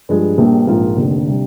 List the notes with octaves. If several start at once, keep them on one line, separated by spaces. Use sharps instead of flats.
G2 F3 G#3
A#1 A#2 G3
A#1 G#2 F3 A#3 F4
F1 D#2 D3
C3 G3 D4